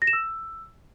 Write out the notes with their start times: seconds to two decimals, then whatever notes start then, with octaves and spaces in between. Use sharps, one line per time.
0.02 A#6
0.07 E7
0.13 E6